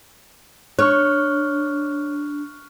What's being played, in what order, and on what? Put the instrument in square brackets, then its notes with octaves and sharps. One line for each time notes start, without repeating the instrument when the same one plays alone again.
[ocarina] D4 [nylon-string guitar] C#5 [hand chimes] C#6 F6 F#6